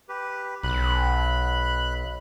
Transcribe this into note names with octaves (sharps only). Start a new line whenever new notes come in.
G4 B4
B1 B5 F#6